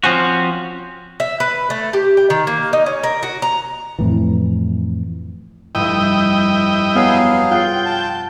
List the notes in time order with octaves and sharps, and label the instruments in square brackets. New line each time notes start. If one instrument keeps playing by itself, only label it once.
[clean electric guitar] F3 C4 C#4 F#4
[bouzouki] E5
B4
A3
G4
G5
D#3
A#3
D#4
C#4
A#4
F#4
A#5
[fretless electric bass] F2 A2 E3
[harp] F1 G2 D#7 [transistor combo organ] E4 D#5 G5
[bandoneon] F#3 G#4 F5 [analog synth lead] B3
[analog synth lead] F4 [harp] F#5 C7 [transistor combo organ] G5
[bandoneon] A5